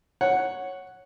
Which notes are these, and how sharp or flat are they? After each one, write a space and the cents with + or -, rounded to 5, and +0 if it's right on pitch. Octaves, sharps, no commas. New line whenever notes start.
C#5 -5 F#5 +0